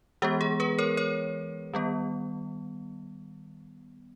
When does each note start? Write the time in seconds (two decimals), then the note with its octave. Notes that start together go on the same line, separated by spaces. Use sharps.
0.22 E3 G#3 B3 G4
0.41 G#4
0.60 G#4 B4
0.79 A#4 C#5
0.97 A#4 C#5
1.73 D#3 G3 B3